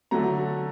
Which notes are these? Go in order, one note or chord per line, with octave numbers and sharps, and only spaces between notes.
D3 F#3 A3 A#5